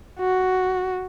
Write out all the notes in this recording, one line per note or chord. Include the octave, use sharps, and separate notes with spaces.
F#4